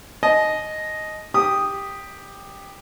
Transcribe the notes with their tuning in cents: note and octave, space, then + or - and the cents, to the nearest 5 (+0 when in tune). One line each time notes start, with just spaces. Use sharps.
D#5 +0 A5 -45
G4 +10 D#6 -5